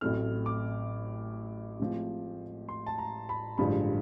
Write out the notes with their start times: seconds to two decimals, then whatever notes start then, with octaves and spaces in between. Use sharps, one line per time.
0.01 A1 A2 F#3 A3 C4 F6
0.46 D6
1.79 A1 A2 F3 G#3 C4
2.69 C6
2.86 A5
2.98 A#5
3.29 B5
3.58 A1 G2 D3 F3 G#3 B5